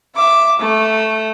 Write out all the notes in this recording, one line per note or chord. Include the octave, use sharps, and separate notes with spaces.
E5 D6
A3